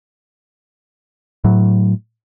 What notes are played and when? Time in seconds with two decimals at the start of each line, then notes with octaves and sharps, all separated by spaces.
1.44 A2 F#3